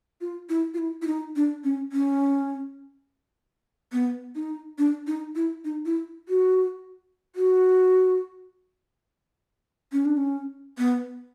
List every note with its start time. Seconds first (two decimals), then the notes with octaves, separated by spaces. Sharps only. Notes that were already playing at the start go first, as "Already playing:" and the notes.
0.21 F4
0.49 E4
0.74 F4
0.78 E4
1.02 E4
1.07 D#4
1.36 D4
1.64 C#4
1.92 C#4
3.92 B3
4.35 D#4
4.78 D4
5.07 D#4
5.35 E4
5.64 D#4
5.85 E4
6.29 F#4
7.36 F#4
9.93 C#4
10.05 D4
10.17 C#4
10.78 B3